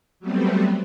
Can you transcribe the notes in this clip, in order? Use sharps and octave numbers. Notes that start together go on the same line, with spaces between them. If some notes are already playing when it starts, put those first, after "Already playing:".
F#3 G3 A3 B3 C4